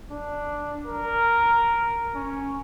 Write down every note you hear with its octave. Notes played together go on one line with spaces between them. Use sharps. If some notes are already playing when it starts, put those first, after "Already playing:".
D4
A#4
C#4